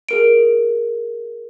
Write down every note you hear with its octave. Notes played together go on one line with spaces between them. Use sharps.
G#4 A#4 D7